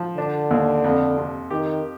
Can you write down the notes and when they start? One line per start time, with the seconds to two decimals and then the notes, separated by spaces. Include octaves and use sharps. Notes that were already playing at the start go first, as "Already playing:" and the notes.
Already playing: F3
0.17 D3 D4
0.51 D#2
0.84 F2
1.17 C3
1.50 D#3 G4